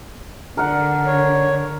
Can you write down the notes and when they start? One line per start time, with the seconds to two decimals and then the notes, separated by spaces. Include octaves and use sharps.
0.57 D3 A#4 F#5
1.06 C#5